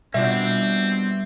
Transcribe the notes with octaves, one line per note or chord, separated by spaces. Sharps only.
B2 G3 C4 D4 F4 E5